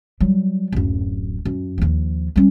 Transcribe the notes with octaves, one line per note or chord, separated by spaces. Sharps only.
F#3 G3
D1 F#2
F#2
D#2 F3
G3 C#4